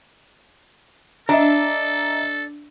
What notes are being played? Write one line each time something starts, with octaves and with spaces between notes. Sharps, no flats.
D4 A4 D#5 E5 A#5